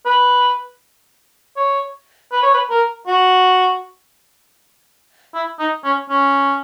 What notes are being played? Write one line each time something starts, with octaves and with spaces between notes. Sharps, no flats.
B4
C#5
B4
C#5
B4
A#4
F#4
E4
D#4
C#4
C#4